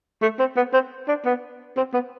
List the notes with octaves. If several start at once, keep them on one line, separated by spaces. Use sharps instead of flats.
A3
C4
B3
C4
D4
B3
C4
B3